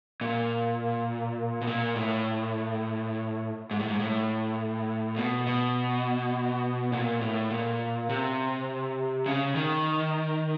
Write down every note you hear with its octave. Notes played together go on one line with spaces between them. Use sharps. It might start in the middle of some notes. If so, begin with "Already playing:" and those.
A#2
B2
A#2
A2
G#2
A2
G#2
A2
B2
B2
A#2
A2
A#2
C3
C#3
D#3